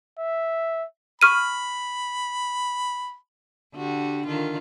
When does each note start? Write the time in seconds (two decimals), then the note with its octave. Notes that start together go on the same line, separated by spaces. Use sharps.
0.19 E5
1.21 B5 C#6 F6 D#7
3.75 D3 F#4 G4
4.27 D3 D#3 F4